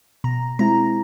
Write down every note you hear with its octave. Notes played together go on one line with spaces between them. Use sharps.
B2 A#5
G#3 C4 E4 A#5